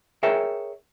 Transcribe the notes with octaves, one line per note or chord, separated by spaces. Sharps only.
G#4 A#4 C#5 E5 G5